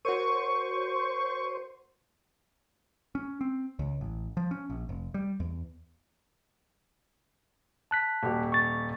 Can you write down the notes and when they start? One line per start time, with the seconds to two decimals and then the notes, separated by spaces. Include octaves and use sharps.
0.05 F#4 A#4 C5 C#5 C#6 D#7
3.15 C#4
3.41 C4
3.79 C#2
4.01 A1
4.37 F3
4.51 C#4
4.70 A#1
4.89 F1
5.14 G3
5.40 E2
7.91 A5 F#6 B6
8.23 D#1 G4
8.52 C#6 A6